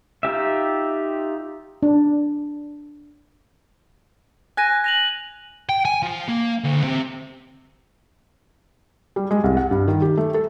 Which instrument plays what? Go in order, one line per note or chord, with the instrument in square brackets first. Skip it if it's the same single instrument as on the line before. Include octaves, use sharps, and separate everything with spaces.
[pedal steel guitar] D#4 F4 G4 E5
[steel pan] D4
[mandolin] G#5 [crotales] F#6 A#6 D#7
[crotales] A#6 F7 F#7
[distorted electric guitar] G5
G#5
F3
A#3
D2
C3
[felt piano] G3
G#3
C2
F#5
G2
D#3
G4
A3
A4